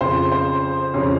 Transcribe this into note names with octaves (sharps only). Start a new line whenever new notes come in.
F2 C#3 F3 C5
C5
F2 C#3 F3 C#4